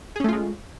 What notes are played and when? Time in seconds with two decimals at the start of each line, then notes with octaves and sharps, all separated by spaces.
0.16 G#4
0.20 C#4
0.24 A3
0.29 F4
0.33 G#3